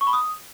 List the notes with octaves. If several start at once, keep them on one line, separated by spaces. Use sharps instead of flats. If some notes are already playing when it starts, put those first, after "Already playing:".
C#6
B5
D#6